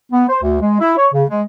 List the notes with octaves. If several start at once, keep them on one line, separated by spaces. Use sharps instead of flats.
B3
C5
D2
G#3
E4
C#5
C#3
G#3